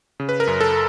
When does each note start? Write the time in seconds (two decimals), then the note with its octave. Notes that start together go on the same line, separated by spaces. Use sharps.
0.20 C#3
0.29 B4
0.40 A#4
0.47 F#2
0.61 A4